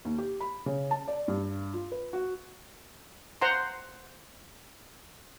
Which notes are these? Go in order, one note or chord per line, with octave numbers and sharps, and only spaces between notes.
D#2
G4
B5
C#3
A5
D5
G2
F4
B4
F#4
C5 F#5 A#5 C6